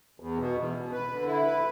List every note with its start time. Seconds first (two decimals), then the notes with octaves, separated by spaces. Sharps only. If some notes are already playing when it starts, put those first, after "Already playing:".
0.20 E2
0.38 B2
0.56 E2
0.74 B2
0.92 B4
1.09 D3
1.27 E4
1.45 B4